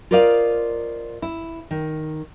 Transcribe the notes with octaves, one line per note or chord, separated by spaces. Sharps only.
F4 A#4 C5 D5 D#5 F5
E4
D#3